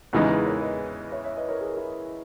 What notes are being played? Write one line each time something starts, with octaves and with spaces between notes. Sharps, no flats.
E2 C#3 E3 G#3 D#4
G#4 B4
A#4 C#5
B4 D#5
C#5 E5
C#5 E5
B4 D#5
A#4 C#5
G#4
A#4
E4 G#4